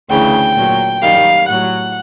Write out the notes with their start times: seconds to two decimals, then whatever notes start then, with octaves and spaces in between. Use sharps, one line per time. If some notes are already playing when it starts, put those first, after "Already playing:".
0.10 D2 C#3 E3 G5
0.56 A#2 F#3
1.02 F#2 D#3 G3 F5
1.48 A2 F#3 F#5